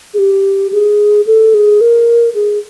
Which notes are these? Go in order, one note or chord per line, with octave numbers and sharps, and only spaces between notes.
G#4
G4
G#4
A4
G#4
A#4
G#4